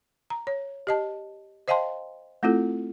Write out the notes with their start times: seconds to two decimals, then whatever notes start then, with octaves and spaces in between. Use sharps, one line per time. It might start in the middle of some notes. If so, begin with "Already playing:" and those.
0.30 A#5
0.47 C#5
0.87 G4 D#5 A5
1.68 C5 D#5 F5 G5 A5 C6
2.43 A3 C4 E4 F4 A4